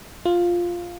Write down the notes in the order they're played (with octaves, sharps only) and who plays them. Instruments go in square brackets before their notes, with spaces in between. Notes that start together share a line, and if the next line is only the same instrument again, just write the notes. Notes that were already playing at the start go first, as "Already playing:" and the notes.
[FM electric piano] F4